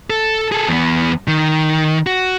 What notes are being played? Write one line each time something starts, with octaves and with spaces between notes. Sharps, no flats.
A4
G#4 A4
E2 B3
D#3
F#4